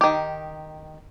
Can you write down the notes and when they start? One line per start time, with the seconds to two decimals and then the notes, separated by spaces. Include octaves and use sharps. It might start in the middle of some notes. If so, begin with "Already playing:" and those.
0.01 D#3 G4